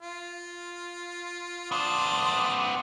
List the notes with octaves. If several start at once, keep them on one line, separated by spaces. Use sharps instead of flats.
F4
B3 D4 C5 D6 D#6